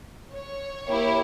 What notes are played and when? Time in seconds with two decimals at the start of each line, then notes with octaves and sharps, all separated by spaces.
0.34 C#5
0.88 A#3 E4 G4